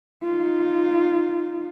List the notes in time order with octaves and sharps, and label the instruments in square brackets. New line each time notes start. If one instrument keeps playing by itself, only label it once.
[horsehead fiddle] D#4 F4